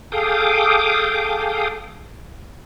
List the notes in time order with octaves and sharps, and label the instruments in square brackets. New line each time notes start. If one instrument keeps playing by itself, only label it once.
[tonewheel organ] G#4 A4 F5 G5 D6 D#6